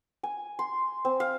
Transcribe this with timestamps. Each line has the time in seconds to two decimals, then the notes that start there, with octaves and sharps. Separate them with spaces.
0.23 G#5
0.59 C6
1.05 C4
1.20 F5